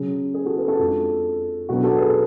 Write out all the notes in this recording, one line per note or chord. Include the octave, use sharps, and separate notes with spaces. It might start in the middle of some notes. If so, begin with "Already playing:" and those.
Already playing: C#3 F#3 C#4 G#4
G#4
F#4 A4
G#4 B4
F#4 A4
F2 F3 G#3 D4
B2 F#3 B3 D4 F#4
F#4 A4
G#4 B4